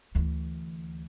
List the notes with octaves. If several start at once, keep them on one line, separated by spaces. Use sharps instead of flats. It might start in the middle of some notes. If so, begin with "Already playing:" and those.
D2 E3